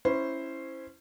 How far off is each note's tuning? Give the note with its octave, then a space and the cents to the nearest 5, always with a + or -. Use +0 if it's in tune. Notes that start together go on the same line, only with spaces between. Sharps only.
C#4 -10 E4 +0 C5 +0